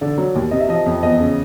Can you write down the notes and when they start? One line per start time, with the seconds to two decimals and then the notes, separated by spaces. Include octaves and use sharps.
0.01 D3 D5
0.18 F#3
0.35 D#2
0.51 C3 D#5
0.60 E5
0.69 F3 D#5
0.86 F2
1.02 E2 D#5
1.20 C#3